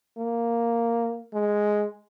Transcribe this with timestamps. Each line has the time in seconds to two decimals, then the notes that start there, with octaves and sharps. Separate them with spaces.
0.17 A#3
1.33 G#3